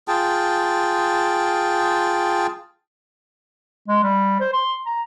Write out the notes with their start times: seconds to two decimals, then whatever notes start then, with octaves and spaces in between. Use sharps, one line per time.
0.08 F4 G#4 G5 A5
3.88 G#3
4.03 G3
4.40 C5
4.53 C6
4.86 A#5